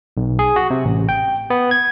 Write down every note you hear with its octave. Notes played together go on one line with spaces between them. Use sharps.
B1
G#4
F#4
C3
A1
G5
B3
G#6